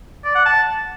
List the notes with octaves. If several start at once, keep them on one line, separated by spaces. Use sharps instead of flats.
D5
F#5
A5